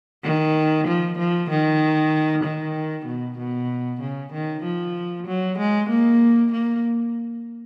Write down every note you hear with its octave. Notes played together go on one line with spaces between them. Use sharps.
D#3
F3
F3
D#3
D#3
B2
B2
C#3
D#3
F3
F#3
G#3
A#3
A#3